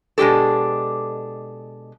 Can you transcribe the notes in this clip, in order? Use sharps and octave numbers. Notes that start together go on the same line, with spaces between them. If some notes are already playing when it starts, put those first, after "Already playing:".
B2 G#3 D4 G4 A4